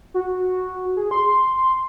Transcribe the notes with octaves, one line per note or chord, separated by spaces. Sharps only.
F#4
G#4
C6